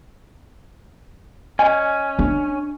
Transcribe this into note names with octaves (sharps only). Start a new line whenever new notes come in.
C#4 D5 D#5 G#5
D4